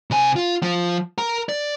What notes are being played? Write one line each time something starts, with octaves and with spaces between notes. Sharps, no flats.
C3 G#5
F4
F3
A#4 A#5
D5